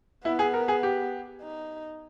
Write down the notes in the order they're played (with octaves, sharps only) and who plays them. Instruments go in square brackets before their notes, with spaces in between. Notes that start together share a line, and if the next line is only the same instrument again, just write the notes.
[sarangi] B3 [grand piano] E4
[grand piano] G#4
A#4
G#4
G4
[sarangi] D#4